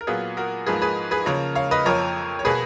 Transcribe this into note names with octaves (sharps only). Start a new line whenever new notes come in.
A#4
A#2 F#3 B3 F4 G#4
F#4 A#4
G#2 F3 A#3 G#4 B4
G#4 B4
G#4 B4
C#3 F3 A#3 A#4 C#5
C#5 F5
B4 D#5
F2 F3 A#3 A#4 C#5
C#5
B2 A#3 G#4 B4